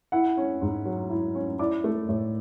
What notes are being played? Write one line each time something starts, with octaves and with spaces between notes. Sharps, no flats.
E4 F#5
C#4
G#2
F#3
E4
C#4
E4 D5 D6
A3
A2